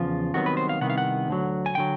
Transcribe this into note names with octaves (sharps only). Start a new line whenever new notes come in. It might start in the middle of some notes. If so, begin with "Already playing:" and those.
Already playing: E2 C#3 F3 F4
C2 C3 D#3 F#3 B3 F#4
B4
C5
F5
C2 C3 D#3 B3 F#5
F5
F#5
D2 D3 F#3
G#5
D3 F#3 G5